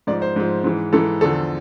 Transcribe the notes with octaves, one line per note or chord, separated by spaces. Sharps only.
G#2 F3 D5
C5
G#2 F3
G#2 E3
G#2 E3 A4
E2 D3 F3 A4